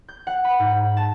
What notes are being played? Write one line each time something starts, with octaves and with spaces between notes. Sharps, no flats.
G6
F#5
B5
G#2
A5